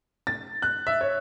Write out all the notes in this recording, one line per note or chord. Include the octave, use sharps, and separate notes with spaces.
A6
F#6
E5
C#5